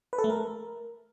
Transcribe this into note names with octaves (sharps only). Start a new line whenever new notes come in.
B4
A4
A3
A#4